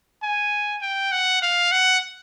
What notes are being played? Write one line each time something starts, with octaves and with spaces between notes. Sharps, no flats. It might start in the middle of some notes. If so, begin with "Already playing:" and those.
G#5
G5
F#5
F5
F#5